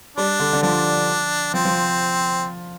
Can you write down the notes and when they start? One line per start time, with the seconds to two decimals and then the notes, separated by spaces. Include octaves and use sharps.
0.17 G3 D4
0.40 D3
0.53 D3
0.63 F3 D4
1.53 F3 C4
1.65 F3